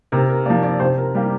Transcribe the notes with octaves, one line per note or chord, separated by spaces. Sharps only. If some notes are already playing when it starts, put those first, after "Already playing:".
C3 A#4
A#4
F3 A#3 D5
D5
C3 C5
A#4
G3 A#3 G4